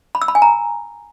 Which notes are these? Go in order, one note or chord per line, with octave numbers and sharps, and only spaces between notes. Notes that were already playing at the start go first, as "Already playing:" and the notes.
B5
E6
B5
G#5
A#5